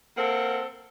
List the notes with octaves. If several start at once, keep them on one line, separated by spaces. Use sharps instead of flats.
A#3 C4 A4 A#4 F#5